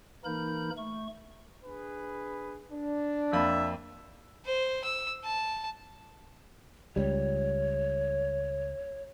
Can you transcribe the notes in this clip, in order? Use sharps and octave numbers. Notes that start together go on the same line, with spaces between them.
E3 A#3 D#4 A#4 B5 G6
A3 C#6
D4 G#4 B4
D4
F2 A#3 E5 B5
C5
E6
A5
C#2 G3 C#5